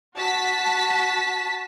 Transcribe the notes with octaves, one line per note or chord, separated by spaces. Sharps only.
F#4 A5 B6